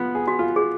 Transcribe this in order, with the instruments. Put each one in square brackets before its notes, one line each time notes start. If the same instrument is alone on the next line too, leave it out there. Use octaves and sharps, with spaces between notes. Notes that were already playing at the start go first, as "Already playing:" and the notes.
Already playing: [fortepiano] F3 B3
G#4
[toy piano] F#4
[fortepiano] F4
[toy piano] G#4